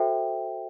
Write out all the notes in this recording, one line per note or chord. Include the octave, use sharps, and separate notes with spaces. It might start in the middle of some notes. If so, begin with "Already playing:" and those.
Already playing: F#4 A4 C5 E5 G5